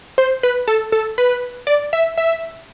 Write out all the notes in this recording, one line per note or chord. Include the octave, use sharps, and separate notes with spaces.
C5
B4
A4
A4
B4
D5
E5
E5